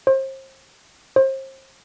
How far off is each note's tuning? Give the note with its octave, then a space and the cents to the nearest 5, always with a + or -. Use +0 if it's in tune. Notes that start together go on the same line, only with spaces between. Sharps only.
C5 +35
C5 +35